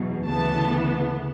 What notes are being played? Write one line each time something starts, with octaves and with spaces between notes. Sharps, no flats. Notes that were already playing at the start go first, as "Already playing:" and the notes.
Already playing: E2 B2 F#3
D2 C#3 E3 B3 A5